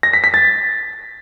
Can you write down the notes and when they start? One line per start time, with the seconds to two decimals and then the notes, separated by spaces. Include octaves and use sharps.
0.03 A#6
0.13 B6
0.24 B6
0.34 A6